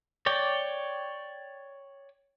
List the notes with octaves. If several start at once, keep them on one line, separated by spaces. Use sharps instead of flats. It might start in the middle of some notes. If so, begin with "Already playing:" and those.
C#5 D5 G5